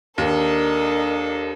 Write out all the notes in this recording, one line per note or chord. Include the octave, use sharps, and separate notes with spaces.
D#2 D4 A4 A#4 D#5